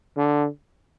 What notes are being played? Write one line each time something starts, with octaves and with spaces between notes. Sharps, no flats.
D3